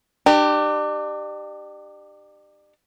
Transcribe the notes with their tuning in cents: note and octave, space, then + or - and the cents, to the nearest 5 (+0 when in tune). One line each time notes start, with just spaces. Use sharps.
D4 +40 G4 +0